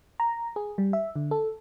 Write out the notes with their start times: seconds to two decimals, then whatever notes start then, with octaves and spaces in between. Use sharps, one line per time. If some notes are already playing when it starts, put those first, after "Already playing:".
0.20 A#5
0.56 G#4
0.78 G3
0.93 E5
1.16 D3
1.31 A4